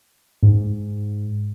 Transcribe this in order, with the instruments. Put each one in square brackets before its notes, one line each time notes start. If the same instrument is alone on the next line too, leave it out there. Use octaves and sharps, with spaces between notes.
[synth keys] G#2